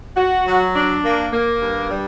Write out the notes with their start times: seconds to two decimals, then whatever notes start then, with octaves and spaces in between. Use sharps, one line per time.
0.16 F#4
0.45 F#3
0.74 D4
1.03 A#3
1.31 A#3
1.61 G2
1.89 G3